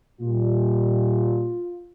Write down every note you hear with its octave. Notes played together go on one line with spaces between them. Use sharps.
A#2 G3 F4